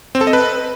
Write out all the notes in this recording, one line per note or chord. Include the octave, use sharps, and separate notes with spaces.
C4
A4
D#5
B4